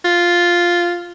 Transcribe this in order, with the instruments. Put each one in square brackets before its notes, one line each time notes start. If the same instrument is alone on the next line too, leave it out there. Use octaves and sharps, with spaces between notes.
[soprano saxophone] F4